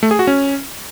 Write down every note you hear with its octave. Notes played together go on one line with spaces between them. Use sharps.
A3
G#4
F#4
C#4